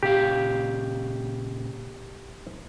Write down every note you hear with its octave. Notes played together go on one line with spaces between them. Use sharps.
A#2 C#3 G4 F5